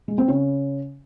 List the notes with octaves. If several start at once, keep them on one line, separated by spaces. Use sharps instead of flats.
G#3
C4
C#3